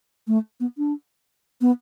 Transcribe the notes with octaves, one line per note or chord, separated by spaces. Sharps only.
A3
B3
D4
B3